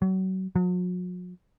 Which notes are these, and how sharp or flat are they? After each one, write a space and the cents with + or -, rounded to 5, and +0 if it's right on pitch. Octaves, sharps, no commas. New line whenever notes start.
F#3 +30
F#3 -45